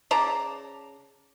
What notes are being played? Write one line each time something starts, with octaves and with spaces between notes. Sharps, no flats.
C#3 D5 A5 A#5